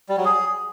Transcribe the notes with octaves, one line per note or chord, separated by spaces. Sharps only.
G3
F#3
G#4